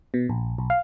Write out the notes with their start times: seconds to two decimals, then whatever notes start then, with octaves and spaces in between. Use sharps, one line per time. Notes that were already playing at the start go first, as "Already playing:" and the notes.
0.14 B2
0.29 A#1
0.58 B1
0.70 F5